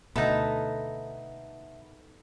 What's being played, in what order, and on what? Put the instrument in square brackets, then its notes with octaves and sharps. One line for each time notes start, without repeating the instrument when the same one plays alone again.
[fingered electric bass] D2 B2 [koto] B3 D#4 [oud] A4 [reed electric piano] E5 B5